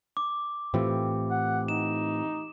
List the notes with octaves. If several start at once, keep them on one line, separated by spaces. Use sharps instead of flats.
D6
A2 E3 A3 C4 F4 G4
F#5
D#4 E7